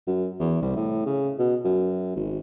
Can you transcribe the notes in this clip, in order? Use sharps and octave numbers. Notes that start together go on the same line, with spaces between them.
F#2
E2
C2
A2
C#3
B2
F#2
G#1